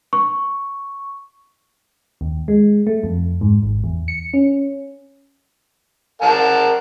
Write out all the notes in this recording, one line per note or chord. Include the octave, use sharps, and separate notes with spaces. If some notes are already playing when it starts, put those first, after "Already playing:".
C#6
D#2
G#3
A3
F2
G#2
G#1
E2
C#7
C#4
A#4 F#5 A5